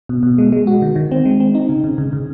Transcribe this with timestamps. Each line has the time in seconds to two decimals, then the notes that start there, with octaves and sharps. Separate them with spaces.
0.09 B2
0.23 B2
0.38 G#3
0.52 G#3
0.67 F#4
0.82 D#3
0.96 D#3
1.11 C4
1.25 G#3
1.40 C4
1.55 D#4
1.69 C#3
1.84 C#3
1.98 C#3
2.13 C#3